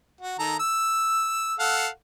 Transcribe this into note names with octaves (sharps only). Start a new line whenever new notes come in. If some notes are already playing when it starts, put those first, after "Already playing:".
F#4
D#3 A4 A#5
E6
A4 F5 F#5